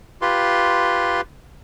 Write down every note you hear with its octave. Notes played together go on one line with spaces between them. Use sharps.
F4 G4 B4 C6